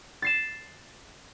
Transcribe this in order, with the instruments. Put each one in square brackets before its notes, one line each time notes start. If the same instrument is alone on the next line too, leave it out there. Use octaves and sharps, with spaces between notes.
[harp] A6 C7 E7